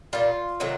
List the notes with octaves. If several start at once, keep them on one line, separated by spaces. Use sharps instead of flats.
A#2 G3 F4
C3 D#3 F#3 A3